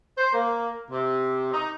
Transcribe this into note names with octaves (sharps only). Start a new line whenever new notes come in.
C5
A#3
C3
D#4